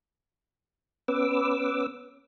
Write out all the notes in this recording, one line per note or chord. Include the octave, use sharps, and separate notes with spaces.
B3 C#4 B4 D6 E6